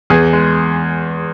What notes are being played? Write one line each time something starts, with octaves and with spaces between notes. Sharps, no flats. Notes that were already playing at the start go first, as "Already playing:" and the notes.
E2 G#4
G#3